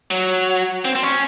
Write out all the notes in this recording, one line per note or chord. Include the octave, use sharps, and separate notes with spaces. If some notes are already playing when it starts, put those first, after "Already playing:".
F#3
C4
C4
C#4